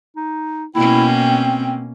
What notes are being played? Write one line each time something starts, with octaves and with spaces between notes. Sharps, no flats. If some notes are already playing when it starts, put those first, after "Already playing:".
D#4
B2 A#3 C#4 E4 G5
C4